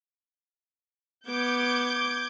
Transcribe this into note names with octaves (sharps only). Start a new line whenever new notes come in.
B3 D6 G6 G#6